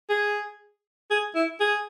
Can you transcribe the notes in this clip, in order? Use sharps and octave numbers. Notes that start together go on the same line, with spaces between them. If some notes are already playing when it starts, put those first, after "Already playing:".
G#4
G#4
E4
G#4